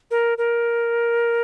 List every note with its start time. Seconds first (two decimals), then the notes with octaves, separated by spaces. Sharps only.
0.11 A#4
0.38 A#4